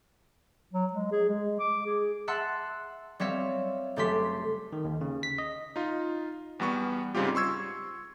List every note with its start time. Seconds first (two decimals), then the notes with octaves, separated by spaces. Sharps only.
0.73 F#3
0.93 G#3
1.12 G#4
1.29 G#3
1.59 D6
1.86 G#4
2.28 E5 F#5 A5 C6 E6 F#6
3.20 G3 C4 C#5 E5 F5
3.96 F#1 A3 G4 A4 C6 B6
4.73 D#3
4.85 D#2
5.01 C#3
5.23 B6
5.38 D#5
5.76 D#4 F4
6.60 E2 G3 B3 C#6
7.15 G#2 C#3 G3 C4 F4 G4
7.35 C6 C#6 E6 G#6